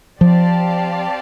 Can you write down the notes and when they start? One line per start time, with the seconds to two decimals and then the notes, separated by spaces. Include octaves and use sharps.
0.20 F3 C4 G4 D5 F5 A5